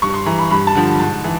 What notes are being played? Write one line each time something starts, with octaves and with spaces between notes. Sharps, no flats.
G2 C#6
C6
E3 A#5
B5
G2 B5
A5
D3 F3
G#2 A5
E3